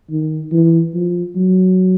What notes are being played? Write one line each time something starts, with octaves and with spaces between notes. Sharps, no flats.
D#3
E3
F3
F#3